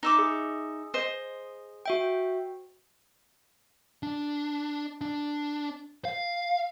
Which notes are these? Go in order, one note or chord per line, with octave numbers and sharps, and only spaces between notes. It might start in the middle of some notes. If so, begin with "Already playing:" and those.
D#4 E5 D6
G#4
C5 D#5
F#4 E5 G5
D4
D4
F5